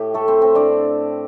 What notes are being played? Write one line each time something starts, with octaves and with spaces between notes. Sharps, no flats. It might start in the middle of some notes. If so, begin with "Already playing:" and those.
Already playing: A2 G4
A3 A4
C4 C5
C4 C5
A2 D4 D5